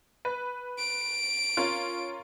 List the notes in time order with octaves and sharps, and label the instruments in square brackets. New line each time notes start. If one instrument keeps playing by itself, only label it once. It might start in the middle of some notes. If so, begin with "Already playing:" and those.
[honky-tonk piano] B4
[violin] D7
[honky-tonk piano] C#4 F4 A#4